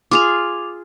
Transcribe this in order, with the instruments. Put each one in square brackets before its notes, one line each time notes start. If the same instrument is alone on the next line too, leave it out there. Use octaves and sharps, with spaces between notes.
[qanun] F4 G#4 [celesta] D6 F7